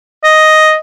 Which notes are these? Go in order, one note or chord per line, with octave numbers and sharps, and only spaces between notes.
D#5